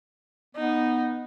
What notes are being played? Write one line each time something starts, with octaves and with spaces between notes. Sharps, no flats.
B3 D#4